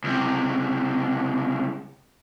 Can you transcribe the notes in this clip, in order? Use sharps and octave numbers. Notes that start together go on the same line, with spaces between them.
C#2 C3